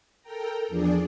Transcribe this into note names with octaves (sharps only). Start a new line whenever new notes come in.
A4 A#4 G5 A#5
E2 F3 D4 G#4 D5